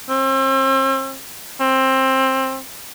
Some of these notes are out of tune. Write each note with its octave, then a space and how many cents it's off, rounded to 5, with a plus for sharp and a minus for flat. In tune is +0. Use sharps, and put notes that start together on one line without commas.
C4 +40
C4 +20